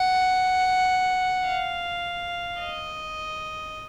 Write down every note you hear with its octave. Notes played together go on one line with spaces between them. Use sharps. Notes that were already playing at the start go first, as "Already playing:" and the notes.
Already playing: F#5
F5
D#5